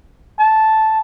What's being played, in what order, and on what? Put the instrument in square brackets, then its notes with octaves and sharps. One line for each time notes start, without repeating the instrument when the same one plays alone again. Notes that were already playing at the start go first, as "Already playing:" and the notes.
[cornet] A5